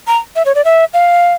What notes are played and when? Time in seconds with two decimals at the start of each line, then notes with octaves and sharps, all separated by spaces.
0.07 A#5
0.36 E5
0.46 C#5
0.55 D5
0.65 E5
0.93 F5